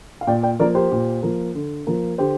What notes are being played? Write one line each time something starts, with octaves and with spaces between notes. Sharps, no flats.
F5
A#2 D5 G5
D5 G5
F3 A#3 A#4 D5
G4 C5
A#2
F3 A#3
D3
F3 A#3
D3 G4 C5